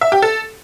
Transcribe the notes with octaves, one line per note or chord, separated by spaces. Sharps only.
E5
G4
A4